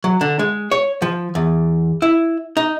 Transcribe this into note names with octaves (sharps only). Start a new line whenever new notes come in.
F#3
D3
G#3
C#5
F3
E2
E4
D#4